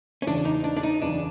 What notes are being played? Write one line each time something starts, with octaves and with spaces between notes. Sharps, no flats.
C#4
F#1 E2 C#3 D4
D#4
D4
D4
D#4
F#1 E2 C#3 D4